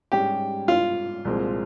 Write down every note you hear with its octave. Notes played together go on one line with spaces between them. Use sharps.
G#2 G3 C#4 G4
F4
C2 A#2 F3 G#3 C4